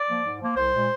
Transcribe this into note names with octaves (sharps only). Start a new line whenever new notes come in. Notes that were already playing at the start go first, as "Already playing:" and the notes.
Already playing: D5
F3 A#3
G#2
F3 A#3
C2 C5
A#2 G#3